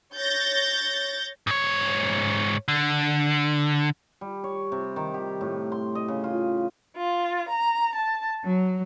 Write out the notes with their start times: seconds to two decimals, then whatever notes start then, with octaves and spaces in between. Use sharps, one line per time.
0.15 C#5 G6 A6 A#6
1.47 G#2 C#5
2.68 D3
4.21 G3
4.44 C#5
4.72 C3
4.96 D#3
5.14 G4
5.41 A2
5.72 C6
5.95 D#5
6.08 C#3
6.24 F4
6.95 F4
7.49 A#5
7.95 A5
8.44 F#3